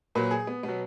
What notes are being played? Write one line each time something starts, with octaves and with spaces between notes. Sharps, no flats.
A#2 F#3 B4
G#4
B3
B2 F#3 B3